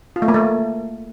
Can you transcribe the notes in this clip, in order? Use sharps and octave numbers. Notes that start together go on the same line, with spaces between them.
F4
A3
A#3
A3